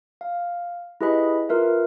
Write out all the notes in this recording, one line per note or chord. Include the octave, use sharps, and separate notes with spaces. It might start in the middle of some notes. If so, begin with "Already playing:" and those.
F5
E4 G4 G#4 B4 D#5 B5
F4 A#4 B4 E5